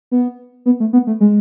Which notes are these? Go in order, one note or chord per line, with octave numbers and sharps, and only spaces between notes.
B3
B3
A3
B3
A3
G#3